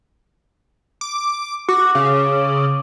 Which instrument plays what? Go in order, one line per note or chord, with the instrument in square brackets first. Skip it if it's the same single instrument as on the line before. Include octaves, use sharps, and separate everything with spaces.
[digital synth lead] D6
[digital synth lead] F#4 [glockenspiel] D6
[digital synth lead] C#3